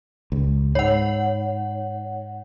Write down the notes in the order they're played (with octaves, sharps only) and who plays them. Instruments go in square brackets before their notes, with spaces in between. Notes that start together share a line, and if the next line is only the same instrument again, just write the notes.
[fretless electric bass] C#2
[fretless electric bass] G#2 [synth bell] C#5 F#5